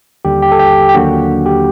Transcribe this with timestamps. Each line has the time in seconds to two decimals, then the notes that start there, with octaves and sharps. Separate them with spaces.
0.25 D#2 D3 G3 G4
0.42 G4
0.52 A4
0.60 G4
0.89 G4
0.94 D#2 D3 F#3 A#3 D4 F#4
1.46 G4